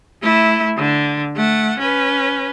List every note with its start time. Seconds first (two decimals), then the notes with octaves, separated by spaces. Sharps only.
0.22 A3 E4
0.77 D3
1.36 A3 F#5
1.79 C#4 B4